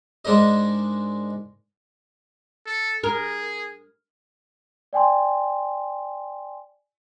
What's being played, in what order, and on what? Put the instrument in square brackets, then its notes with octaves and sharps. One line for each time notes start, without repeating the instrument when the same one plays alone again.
[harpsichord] G#2 G#3 D4 A#4 D#5
[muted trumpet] A4
[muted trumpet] G#4 [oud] A#4
[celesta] D5 G5 G#5 C6